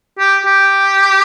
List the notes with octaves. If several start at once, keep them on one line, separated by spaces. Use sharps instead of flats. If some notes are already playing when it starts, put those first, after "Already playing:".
G4
G4